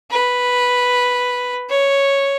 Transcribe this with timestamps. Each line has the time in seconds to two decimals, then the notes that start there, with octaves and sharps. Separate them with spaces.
0.11 B4
1.69 C#5